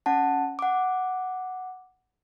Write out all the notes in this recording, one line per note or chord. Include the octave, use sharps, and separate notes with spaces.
C#4 F#5 A5
F#5 D6